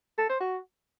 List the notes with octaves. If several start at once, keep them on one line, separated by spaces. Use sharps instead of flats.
A4
C5
F#4